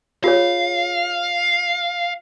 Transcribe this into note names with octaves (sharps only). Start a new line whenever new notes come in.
F4 G#4 C#5 F5